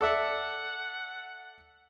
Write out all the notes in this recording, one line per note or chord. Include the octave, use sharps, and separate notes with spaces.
A4 D5 E5 F#5